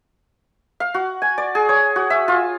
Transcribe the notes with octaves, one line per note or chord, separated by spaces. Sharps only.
F5
F#4
G#5
D5
G#4
C#5
F#4
E5
F4